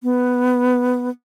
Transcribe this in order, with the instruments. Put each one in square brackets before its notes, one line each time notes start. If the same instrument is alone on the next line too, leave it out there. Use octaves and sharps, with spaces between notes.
[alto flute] B3